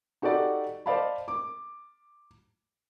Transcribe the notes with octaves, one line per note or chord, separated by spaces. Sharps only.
D#4 F#4 G4 A4 D5
C5 D5 D#5 F5 A5 B5
D6